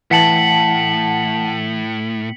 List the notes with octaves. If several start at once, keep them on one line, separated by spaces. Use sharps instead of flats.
A2 E3 F#5 A5 B6 C#7 F#7